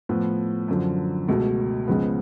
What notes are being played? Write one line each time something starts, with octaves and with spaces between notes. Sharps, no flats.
A2 F3 B3
F#2 D3 F3
C#2 B2 A3
C#2 C#3 F3 G#3 B3